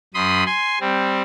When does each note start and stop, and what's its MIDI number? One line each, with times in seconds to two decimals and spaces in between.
0.14 0.44 42
0.14 0.44 83
0.14 0.44 84
0.14 0.44 87
0.46 0.79 80
0.46 0.79 84
0.81 1.22 55
0.81 1.22 60